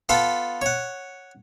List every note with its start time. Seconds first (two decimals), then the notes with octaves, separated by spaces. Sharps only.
0.09 B3 F4 A4 B5
0.62 C#5 F#5